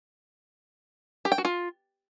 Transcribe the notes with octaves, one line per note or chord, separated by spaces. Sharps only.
G4
G5
F#4
F4